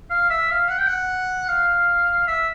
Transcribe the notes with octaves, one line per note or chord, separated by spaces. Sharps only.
F5
E5
F5
F#5
G5
F#5
F5
E5